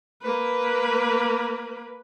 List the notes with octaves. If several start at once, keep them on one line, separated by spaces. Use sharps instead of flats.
A#3 B4